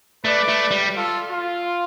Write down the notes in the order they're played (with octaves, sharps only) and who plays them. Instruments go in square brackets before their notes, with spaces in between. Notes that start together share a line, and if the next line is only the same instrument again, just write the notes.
[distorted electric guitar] A3 [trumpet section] B4 D5
[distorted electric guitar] A3
G3
[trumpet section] F4 A4
F4